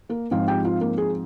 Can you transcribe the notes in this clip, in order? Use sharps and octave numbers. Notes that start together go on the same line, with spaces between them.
A#3 A#4
G#2 F3 C4 F4 F5
G4 G5
F4 F5
A#3 A#4
G#4